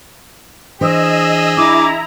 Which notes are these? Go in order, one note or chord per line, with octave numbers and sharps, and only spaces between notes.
E3 D4 G#4 C5 D#5 E6
D4 E4 A#5 D6